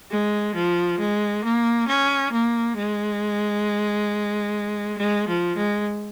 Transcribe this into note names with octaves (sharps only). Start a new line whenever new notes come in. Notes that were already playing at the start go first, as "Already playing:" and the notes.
G#3
F3
G#3
A#3
C#4
A#3
G#3
G#3
F3
G#3